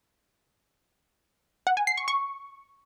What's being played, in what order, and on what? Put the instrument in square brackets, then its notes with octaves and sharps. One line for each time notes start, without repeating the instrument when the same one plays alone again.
[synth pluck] F#5
G#5
C7
C#6
C#6